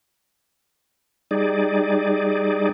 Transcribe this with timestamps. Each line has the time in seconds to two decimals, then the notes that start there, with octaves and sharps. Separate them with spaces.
1.31 G3 D#4 G#4 D5